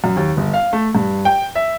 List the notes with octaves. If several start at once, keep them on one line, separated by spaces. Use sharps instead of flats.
F#2
D#2
G1
F5
A3
G2
G5
E5